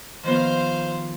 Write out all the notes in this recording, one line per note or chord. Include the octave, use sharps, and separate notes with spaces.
D#3 F3 B3 C5 F5